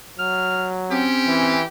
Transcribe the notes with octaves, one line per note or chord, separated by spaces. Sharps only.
F#3 F6
C4 C#4 G4
E3